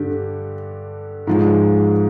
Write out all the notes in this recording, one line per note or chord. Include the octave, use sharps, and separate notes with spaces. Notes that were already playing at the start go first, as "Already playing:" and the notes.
Already playing: G2 D3 G4
G#2 F3 G#3